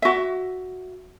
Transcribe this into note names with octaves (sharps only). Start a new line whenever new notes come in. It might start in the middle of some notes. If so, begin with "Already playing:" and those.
F#4 E5